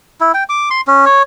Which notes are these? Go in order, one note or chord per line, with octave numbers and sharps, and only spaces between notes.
E4
G5
D6
C6
C#4
C#5